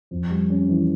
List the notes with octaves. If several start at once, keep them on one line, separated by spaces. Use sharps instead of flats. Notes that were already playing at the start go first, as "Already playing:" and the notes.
F2
G3
C#4
E3